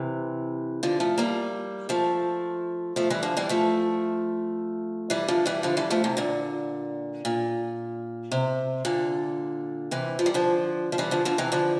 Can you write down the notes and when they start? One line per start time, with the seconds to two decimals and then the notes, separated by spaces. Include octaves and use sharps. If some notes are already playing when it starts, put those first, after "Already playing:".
Already playing: C3 E3
0.83 D3 F3
1.00 F3 A3
1.18 G3 A#3
1.89 F3 A3
2.96 F3 A3
3.10 E3 G3
3.23 D3 F3
3.37 E3 G3
3.49 F3 A3
5.10 E3 G3
5.28 D3 F3
5.46 E3 G3
5.63 D3 F3
5.77 E3 G3
5.90 F3 A3
6.04 C3 E3
6.17 A#2 D3
7.25 A#2
8.32 C3
8.85 A#2 D3
9.91 C3 E3
10.19 F3
10.26 G3
10.34 D3 F3
10.92 F3
10.98 E3 G3
11.11 D3 F3
11.25 D3 F3
11.38 C3 E3
11.52 D3 F3